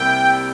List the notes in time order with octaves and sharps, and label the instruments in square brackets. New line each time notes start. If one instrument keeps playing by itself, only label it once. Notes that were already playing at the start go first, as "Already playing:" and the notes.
Already playing: [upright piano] C2 C3 G3 A#3 [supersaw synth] G5